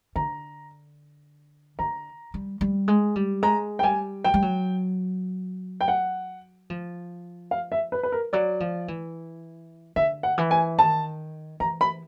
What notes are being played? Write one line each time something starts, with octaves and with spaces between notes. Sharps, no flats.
D3 A#5
D3 A#5
G3
G3
G#3
G3
G#3 A#5
G5
G3 G#5
F#3 G5
G3
F#3
G5
F#5
F3
F5
E5
B4
B4
A#4
F#3 D5
F3
E3
D3 E5
F#5
E3
G#5
D#3 A5
E3 A#5
B5